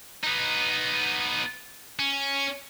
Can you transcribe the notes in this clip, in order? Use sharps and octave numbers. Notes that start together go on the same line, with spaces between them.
B3 D#4
C#4